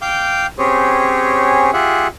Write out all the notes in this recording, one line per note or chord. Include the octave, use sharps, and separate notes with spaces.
F5 G5 D6 G6
C4 C#4 G4 G#4 C#5
F4 G4 G#4 E5 F#5